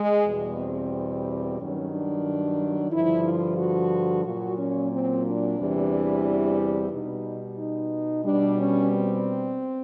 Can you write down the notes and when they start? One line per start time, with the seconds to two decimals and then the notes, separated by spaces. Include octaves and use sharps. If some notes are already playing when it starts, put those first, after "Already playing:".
Already playing: G#3
0.26 E2 B2 G3
0.59 C4
1.59 G2 D#3 F#3 C#4
1.92 D4
2.92 G2 D3 F3 E4
3.25 F4
3.58 F#4
4.25 A#2 F#3 F#4
4.59 C#4
4.92 C4
5.25 D4
5.59 E2 C3 E3 G3
6.92 B2 G3 D#4
7.58 D#4
8.25 B2 G3 D4
8.59 C#4
8.92 C4